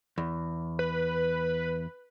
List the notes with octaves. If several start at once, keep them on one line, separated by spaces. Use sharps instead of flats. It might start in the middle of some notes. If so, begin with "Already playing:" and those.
E2
B4